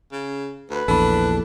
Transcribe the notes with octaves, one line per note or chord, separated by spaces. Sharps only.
C#3
D2 B4
A#1 E2 D4 A4 B5